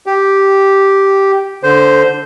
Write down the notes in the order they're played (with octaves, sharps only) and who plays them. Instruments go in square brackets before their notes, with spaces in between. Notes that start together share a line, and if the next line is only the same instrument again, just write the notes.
[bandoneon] G4
D3 C5